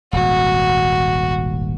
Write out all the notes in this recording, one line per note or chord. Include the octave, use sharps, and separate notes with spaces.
D#1 G#1 F#4